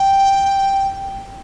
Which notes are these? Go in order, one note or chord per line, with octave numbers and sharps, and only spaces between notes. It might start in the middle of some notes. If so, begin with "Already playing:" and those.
Already playing: G5